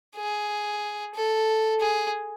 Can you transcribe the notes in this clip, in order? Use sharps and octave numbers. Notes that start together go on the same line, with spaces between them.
G#4
A4
G#4